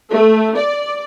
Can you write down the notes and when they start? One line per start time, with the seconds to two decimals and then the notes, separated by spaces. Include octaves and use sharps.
0.12 A3
0.58 D5